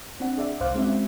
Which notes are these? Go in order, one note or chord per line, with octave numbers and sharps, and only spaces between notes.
C4 D4 F#5
G#4 D5 E5
C2 G#2 C5 F5 D6 F#6
G#3 C4 C#4 F#4 E5